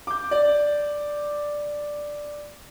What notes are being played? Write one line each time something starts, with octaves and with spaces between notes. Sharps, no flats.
D6 G6
D5